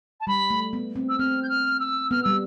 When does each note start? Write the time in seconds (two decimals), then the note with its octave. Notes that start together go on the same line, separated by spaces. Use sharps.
0.20 A5
0.27 G3 B5
0.50 A3
0.73 B3
0.96 C4
1.09 E6
1.19 C4 F6
1.43 G6
1.49 F6
1.80 E6
2.11 B3 F6
2.23 G3 E6